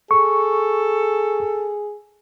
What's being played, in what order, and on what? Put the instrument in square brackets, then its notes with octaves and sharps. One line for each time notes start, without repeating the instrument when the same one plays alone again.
[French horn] G#4 [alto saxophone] A4 [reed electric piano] C#6